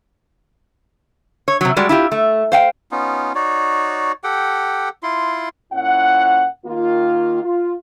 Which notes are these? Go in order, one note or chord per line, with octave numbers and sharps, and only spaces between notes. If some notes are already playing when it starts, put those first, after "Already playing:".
C#5
C3 F#3
G3 G#3 F#4 D5
E4 F4 G4
A3
C5 F5 G5
B3 C#4 D#4 F4
D#4 F#4 C#5 D5
G4 A4 F#5 G5
E4 F4 C6
A#2 C#4 E4 F#5
D#3 A#3 F4
F4